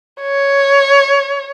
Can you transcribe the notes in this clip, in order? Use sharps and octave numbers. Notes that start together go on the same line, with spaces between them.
C#5